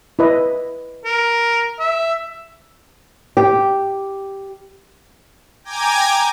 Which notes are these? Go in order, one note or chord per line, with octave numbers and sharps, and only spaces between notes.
E4 B4 D#5
A#4
E5
G4
G5 G#5 A#5 D6 G#6